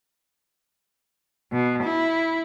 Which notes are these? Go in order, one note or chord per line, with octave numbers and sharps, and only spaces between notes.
B2
E4